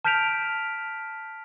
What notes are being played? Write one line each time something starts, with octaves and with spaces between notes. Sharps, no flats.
A5 F6 G6 B6 D7 F7